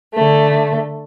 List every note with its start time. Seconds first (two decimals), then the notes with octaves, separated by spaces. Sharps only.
0.15 D3 A3